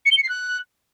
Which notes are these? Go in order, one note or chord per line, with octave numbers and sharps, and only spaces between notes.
C#7
G7
C#7
C7
F#6